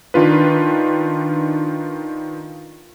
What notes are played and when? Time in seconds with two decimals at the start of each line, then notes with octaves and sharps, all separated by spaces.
0.14 D#3 D4 F4 B4